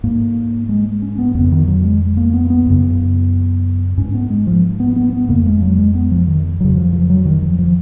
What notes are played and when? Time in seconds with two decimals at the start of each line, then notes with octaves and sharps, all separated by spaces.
0.03 G#2 A#3
0.69 G#3
1.02 C#4
1.18 B3
1.35 F2 C#3 B3
1.52 D#3
1.67 F#3
1.83 G#3
2.17 A#3
2.33 B3
2.50 B3
2.66 F#2 C#3
3.98 G#2 C#4
4.14 B3
4.30 G#3
4.47 F3
4.80 B3
4.96 B3
5.13 B3
5.29 F2 C#3 A#3
5.45 G#3
5.62 F#3
5.78 G#3
5.94 B3
6.11 F3
6.27 D#3
6.60 F2 C#3 F#3
6.77 F3
6.93 F3
7.10 F#3
7.25 D#3
7.42 F3
7.59 F3